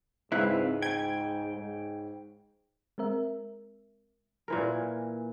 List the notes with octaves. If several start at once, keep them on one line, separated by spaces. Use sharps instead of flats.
C#2 G#2 C4 E4 B4 F5 F#6
G5 G#5 G#6
G#2
G#3 C4 A#4 E5
A#2 E3 A#4